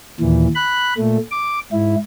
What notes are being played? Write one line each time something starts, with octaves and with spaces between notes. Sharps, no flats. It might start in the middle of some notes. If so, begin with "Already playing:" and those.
D#2 A#2 E3
B5 F#6
A#2 A3
D6
G#2 E4